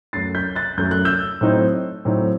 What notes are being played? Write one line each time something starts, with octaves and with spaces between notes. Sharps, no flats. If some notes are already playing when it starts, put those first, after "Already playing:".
F#2 F#3 A3 A6 C7
G6 B6
F#6 A6
F#2 F#3 A3 G6
F#6
E6 G6
A2 F#3 C4 D#4
A2 F#3 C4 D#4